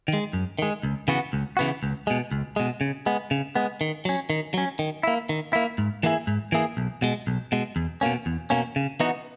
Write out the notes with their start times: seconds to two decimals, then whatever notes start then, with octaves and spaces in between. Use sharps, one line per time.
0.08 D#3
0.13 G#3
0.33 F#2
0.59 D#3 G#3
0.83 C#2
1.08 C#3 E3 B3 F#4
1.33 C#2
1.57 C#3 E3 B3 F#4
1.83 C#2
2.07 B2 G#3
2.31 C#2
2.56 B2 G#3
2.81 C#3
3.06 G#3 B3
3.31 C#3
3.55 G#3 B3
3.81 D#3
4.05 F#3 C#4
4.30 D#3
4.54 F#3 C#4
4.79 D#3
5.03 A#3 E4
5.29 D#3
5.53 A#3 E4
5.78 G#2
6.03 E3 A#3 E4 G#4
6.27 G#2
6.52 E3 A#3 E4 G#4
6.77 B1
7.02 B2 G#3
7.27 B1
7.52 B2 G#3
7.76 E2
8.01 B2 A#3 C#4
8.26 E2
8.50 B2 A#3 C#4
8.76 C#3
9.00 E3 B3 D#4 F#4